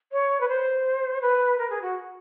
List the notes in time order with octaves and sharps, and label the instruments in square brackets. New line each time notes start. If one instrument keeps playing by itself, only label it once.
[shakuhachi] C#5
B4
C5
B4
A#4
G#4
F#4